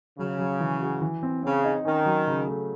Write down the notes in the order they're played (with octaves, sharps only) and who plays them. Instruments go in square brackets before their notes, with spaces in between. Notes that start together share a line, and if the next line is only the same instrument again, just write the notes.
[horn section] C#3 [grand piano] F#3
[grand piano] F#3
E3
F#4
E3
C4
[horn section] C#3 [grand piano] C4
[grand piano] D#4
[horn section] D#3 [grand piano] C#4
[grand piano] F#3
C#3
A3